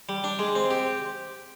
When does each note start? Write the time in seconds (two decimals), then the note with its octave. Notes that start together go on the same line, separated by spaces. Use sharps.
0.09 G3
0.24 D4
0.39 G#3
0.55 C4
0.71 G4